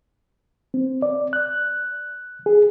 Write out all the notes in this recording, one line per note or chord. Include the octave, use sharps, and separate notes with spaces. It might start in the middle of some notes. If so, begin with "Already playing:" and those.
C4
D5
F#6
G#4